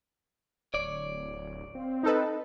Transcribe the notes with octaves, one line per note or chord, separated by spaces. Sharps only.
D1 C#5 D5
C4 F5
D#4 A4 B4 D#5